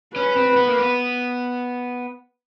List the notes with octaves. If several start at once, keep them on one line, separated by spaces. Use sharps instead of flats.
C#4 B4
C4
B3
A#3
B3